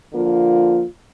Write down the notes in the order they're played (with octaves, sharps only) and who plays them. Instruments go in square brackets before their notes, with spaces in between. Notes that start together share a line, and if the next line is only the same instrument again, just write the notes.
[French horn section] D3 F3 A#3 F4